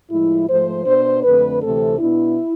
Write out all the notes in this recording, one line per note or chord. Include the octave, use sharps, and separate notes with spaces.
A2 F3 G#3 E4
G#2 F3 A3 C5
B2 B3 D4 C5
F2 D3 A3 C4 B4
D2 C3 E3 A3 C4 A4
B2 B3 D4 E4